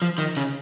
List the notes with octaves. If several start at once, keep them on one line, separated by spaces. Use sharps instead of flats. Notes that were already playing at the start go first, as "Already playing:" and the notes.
F3
D#3
C#3